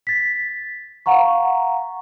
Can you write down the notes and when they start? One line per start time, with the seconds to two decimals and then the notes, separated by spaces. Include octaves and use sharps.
0.07 A6 B6
1.06 F5 F#5 A#5 C#6